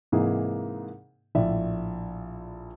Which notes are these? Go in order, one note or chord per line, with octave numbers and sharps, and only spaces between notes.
G#2 C3 E3 A#3 D#4 G#4
A#1 A2 D5 E5